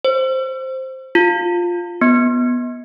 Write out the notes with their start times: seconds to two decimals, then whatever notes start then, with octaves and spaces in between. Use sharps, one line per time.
0.05 C5
1.15 F4
2.01 B3